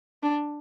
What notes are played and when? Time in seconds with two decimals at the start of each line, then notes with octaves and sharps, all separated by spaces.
0.23 D4